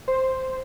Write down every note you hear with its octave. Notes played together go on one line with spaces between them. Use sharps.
C5